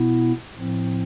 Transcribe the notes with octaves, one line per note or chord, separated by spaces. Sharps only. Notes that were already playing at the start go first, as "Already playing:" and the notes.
Already playing: B2 B3 E4
A2 F3 C4